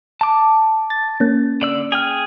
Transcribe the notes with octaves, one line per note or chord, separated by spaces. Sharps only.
A5 D6
A6
A#3 C#4
D3 D5 E6
G#4 G5 F6